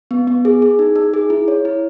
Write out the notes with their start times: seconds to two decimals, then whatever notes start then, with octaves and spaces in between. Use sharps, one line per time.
0.11 B3
0.27 B3
0.45 G#4
0.62 G#4
0.79 D#4
0.96 D#4
1.14 G#4
1.30 E4
1.48 C#5
1.65 E4